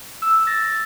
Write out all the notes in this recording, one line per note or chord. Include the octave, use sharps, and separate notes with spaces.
E6
E6 A6 A#6